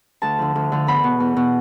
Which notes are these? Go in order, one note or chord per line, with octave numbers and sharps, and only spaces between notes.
D2 A5
D3 F3
D2
D3 F3
E2 B5
B2
E2
B2